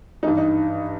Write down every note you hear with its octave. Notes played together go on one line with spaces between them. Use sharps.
G2 E3 D#4
D#4